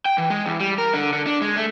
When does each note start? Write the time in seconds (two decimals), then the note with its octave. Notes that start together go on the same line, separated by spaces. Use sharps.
0.05 G5
0.18 E3
0.30 G#3
0.46 E2
0.60 G3
0.78 A#4
0.94 D3
1.13 D3
1.26 D4
1.41 G#3
1.56 A3